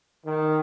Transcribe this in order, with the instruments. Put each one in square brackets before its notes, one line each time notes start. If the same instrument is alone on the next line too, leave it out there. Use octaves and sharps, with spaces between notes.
[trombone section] D#3